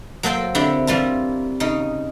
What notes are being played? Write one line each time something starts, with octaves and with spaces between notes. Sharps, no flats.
F#3 A#3 A4 C5 G5
D3 C4 E4 G4
E3 G3 F4 A#4
C#3 D#4